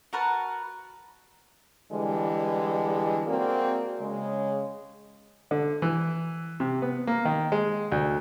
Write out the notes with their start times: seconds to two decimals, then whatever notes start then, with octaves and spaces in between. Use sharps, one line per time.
0.13 F#4 A#4 B4 A5
1.92 D3 E3 G3 G#3
3.27 A#3 C4 F#4 G#4 A#4 D5
4.00 C#3 G#3
5.51 D3
5.82 E3
6.60 C3
6.82 B3
7.07 A#3
7.25 D#3
7.52 G#3
7.92 D2